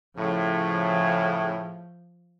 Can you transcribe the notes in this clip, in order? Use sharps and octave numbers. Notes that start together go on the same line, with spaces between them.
A2 C#3 F3